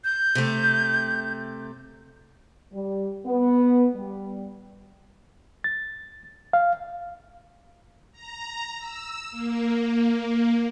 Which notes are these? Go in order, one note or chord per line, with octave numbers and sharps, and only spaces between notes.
G6
C3 A3
G3
B3
G3
A6
F5
A#5
E6
A#3